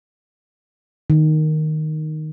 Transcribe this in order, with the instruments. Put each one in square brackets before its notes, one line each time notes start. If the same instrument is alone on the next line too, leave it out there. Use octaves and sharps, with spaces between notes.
[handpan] D#3